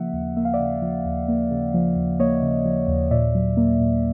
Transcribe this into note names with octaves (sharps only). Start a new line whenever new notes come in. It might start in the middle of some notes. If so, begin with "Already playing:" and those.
Already playing: C#3 F3 A#3 E5 F#5
D#2
A#3 E5
F5
D5 E5
C#3
F3
D#2
A#3
C#3
F3
D#2
A#3 C#5 D#5
C#3
F3
D#2
A#2 D5 E5
F#3
A#3
A#2